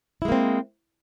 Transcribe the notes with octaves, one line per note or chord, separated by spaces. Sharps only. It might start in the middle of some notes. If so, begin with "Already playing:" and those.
G#3 A#3 C4 E4